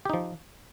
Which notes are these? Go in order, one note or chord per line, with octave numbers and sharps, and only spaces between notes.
F3 D#4 G4